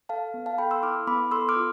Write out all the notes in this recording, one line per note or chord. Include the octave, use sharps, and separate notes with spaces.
A4 F5 A5
B3
F5 A5
A4 G5 B5
C6 E6
E4 D6 F6
B3 B5 D6
A4 C6 E6
D6 F6
F4